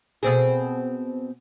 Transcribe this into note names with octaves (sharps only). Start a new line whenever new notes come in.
B2 C4 G#4